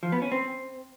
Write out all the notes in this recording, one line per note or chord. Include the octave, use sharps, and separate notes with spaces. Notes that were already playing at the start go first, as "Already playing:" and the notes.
F3
B3
C#4
C4